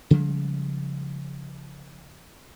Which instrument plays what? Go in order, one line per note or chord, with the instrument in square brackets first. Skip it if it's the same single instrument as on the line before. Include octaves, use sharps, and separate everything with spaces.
[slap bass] C#3 F3 G3 G#3